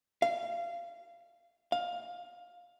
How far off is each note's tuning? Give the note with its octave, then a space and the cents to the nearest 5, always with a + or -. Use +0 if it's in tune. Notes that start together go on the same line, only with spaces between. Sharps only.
F5 -25
F5 +15